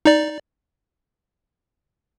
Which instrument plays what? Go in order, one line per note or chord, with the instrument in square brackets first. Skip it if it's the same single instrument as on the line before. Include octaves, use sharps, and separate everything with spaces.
[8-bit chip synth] D#4 D5